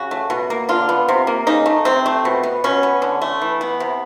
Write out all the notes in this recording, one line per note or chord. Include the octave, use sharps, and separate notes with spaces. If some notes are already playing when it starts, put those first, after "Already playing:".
Already playing: C#3 F#4
A3
B2
A#3
D3 F4
B3
C3
A#3
C#3 D#4
A3
C3 C4
A3
B2
B3
B2 C#4
B3
D3
A3
E3
B3
C3